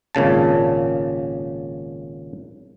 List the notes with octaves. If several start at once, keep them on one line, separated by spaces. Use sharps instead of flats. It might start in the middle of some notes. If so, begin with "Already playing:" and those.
G#1 A#2 C#3 A5